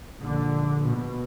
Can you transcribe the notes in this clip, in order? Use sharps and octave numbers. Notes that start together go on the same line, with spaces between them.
A#1 D3
B2